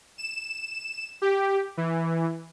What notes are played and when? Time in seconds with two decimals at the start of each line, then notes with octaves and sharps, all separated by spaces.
0.18 E7
1.22 G4
1.77 E3